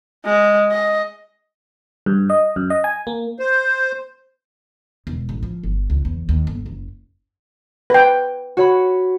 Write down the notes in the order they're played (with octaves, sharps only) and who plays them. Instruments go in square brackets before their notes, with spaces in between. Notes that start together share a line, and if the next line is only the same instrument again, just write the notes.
[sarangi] G#3
D#5
[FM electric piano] G2
D#5
F#2
D#5
G#5
A#3
[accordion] C5
[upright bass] E1
A1
F3
G1
C#2
E2
D#2
G1
F#1
[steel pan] B4 G5
[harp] F#4 C#5 B5